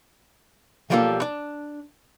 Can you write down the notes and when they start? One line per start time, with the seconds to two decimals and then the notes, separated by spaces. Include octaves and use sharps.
0.90 B1 F3 G3 A#3 F4 A4
1.22 D4